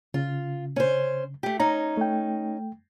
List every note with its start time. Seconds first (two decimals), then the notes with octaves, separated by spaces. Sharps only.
0.14 C#3 F4
0.76 C#4 C5
1.43 A3 G4
1.60 C#4 D#4 A#5
1.97 A3 G5